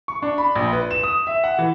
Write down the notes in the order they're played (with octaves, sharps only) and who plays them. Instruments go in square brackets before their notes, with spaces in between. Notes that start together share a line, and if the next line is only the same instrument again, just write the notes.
[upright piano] C#6
D4
B5
A#1
B4
E7
D#6
E5
F#5
E3